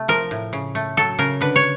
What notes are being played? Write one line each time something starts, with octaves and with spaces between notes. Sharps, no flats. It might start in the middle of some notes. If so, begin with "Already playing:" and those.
Already playing: C3 A3
F3 A#4
A2
C#3
A3
F#3 A4
C#3 A#4
D3 B4
C#5